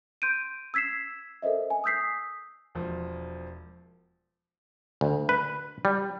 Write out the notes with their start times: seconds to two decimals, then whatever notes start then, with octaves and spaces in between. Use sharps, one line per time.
0.22 C6 G6 D7 D#7
0.74 E6 G#6 B6 C7 E7
1.42 A4 A#4 C5 D#5 E5
1.70 G#5
1.84 D#6 E6 G6 B6 C7
2.75 E1 F3
5.01 D2
5.29 B4
5.85 G3